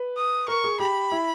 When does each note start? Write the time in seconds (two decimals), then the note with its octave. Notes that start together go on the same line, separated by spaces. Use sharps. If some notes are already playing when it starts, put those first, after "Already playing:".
Already playing: B4
0.17 D#6
0.48 A#4 C#6
0.64 G#4
0.80 G4 B5
1.12 E4